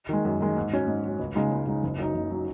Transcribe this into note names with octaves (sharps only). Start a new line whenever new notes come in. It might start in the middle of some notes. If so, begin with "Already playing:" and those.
D#3 G#3
F#2
D#3 G#3
G#2
F#3 C#4
G#2
F#3 C#4
C#2
C#3 G#3 D#4
C#2
C#3 G#3 D#4
F#1
F#2 F#3 D#4
F#1
F#3 D#4